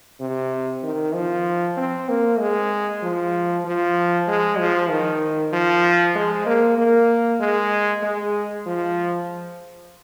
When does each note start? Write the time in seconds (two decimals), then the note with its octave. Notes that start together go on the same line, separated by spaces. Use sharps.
0.20 C3
0.83 D#3
1.14 F3
1.77 C4
2.08 A#3
2.39 G#3
3.03 F3
3.65 F3
4.28 G#3
4.58 F3
4.90 D#3
5.53 F3
6.15 G#3
6.46 A#3
6.78 A#3
7.40 G#3
8.03 G#3
8.66 F3